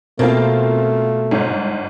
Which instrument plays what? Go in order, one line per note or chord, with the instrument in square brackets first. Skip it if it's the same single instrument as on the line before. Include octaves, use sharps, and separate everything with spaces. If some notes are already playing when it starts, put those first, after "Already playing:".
[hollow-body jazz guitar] B2 [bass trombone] A3 [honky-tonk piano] A#3 C4 F4
[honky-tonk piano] G1 G#2